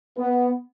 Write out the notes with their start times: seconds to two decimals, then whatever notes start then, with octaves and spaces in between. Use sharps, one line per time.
0.17 B3